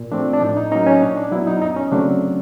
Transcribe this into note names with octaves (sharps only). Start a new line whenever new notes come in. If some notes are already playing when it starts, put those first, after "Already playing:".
Already playing: A#2
F3 A3 C4 D4
D4
A2 D#4
D#4
F#3 A#3 C#4 D#4
C#4
A#2 D4
D4
F#3 B3 E4
D#4
F#2 D#4
C#4
C#3 F#3 A3 C4 D4